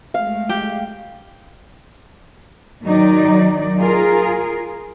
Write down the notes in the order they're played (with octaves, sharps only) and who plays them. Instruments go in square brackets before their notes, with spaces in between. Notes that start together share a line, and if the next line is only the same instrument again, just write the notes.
[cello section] G#3 A3 [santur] F5
[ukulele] G4
[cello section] D#3 F#3 D#4 D5
F4 G#4 A#4